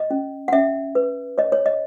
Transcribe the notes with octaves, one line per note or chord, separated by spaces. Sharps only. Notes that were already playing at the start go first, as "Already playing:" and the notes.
Already playing: D#5
C#4
F#5
C#4 E5
B4
C#5 D#5
C#5
D#5